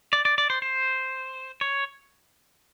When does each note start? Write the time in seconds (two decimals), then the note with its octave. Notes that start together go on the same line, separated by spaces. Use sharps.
0.13 D5
0.25 D5
0.38 D5
0.50 C5
0.62 C5
1.61 C#5